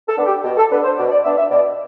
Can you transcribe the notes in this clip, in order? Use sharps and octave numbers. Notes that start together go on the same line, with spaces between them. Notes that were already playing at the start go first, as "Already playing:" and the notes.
A4
B3 D4
G4
B2 G4
A4
B3 D4 B4
C5
B2 D5
D5
B3 D4 E5
E5
B2 D5